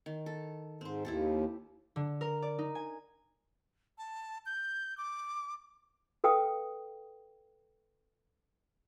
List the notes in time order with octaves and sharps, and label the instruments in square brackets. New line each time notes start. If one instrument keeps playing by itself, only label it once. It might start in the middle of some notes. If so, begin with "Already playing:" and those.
[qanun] D#3
A4
[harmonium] G#2 [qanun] C4 C5
[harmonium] D#2 [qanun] E4 G4 A4
[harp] D3
A#4
D5
D#4
G#5
[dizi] A5
G6
D6
[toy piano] A4 B4 F5 G5 D#6